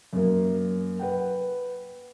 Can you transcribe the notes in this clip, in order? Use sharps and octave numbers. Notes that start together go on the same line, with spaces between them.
F#2 A#3
B4 F#5 G5